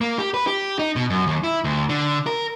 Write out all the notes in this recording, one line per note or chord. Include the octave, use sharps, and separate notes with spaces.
A#3
G4
B4
G4
D#4
B2
F#2
D#2
E4
D2
D3
A#4